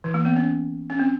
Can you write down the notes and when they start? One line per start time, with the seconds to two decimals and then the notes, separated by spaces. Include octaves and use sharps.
0.04 E3
0.14 A#3
0.25 B3
0.36 C#4
0.90 C#4
0.99 C4